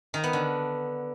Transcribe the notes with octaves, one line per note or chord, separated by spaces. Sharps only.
D#3
B3
D3